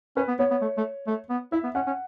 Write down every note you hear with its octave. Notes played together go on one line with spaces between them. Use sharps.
C#4 B4
B3
B3 C#5
B3
A3
A3
A3
B3
E4 E5
B3
C#4 F#5
C#4